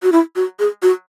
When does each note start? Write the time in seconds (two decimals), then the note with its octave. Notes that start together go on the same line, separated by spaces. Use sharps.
0.03 F#4
0.12 E4
0.36 F#4
0.59 G#4
0.82 F#4